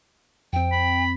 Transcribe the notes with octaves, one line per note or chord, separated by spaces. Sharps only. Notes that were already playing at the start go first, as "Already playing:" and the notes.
F2 C4 G5
B5